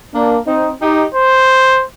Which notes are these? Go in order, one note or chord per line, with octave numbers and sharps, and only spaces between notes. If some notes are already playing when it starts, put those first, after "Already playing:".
A#3 D4
C4 D#4
D#4 G4
C5